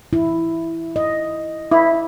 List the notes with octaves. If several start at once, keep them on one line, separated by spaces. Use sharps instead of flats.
E4
D#5
E4